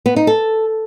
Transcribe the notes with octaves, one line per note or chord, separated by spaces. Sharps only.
B3
D#4
A4